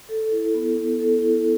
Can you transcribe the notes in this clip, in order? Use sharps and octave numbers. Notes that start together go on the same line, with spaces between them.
A4
E4
B3
B3
A4
E4